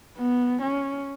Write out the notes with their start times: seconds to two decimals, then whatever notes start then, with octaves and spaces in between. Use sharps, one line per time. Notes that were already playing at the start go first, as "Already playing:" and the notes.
0.18 B3
0.63 C#4